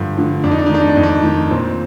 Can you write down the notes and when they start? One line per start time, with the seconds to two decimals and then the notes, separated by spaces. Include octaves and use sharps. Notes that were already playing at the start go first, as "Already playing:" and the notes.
Already playing: G2 D3 F3
0.17 D3 F3
0.43 F2 D4
0.51 D#4
0.59 D4
0.66 D#4
0.70 D#3 D4
0.81 D#4
0.89 D4
0.96 F2 D#4
1.03 D4
1.23 D#3
1.50 A#2 C4